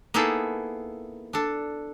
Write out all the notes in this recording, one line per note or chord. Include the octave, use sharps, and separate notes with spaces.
A#3 B3 D#4 E4 G#4 A4
D4 A4